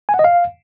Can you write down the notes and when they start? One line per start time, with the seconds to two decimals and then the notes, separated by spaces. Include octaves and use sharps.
0.09 G#5
0.14 F#5
0.19 D#5
0.24 F5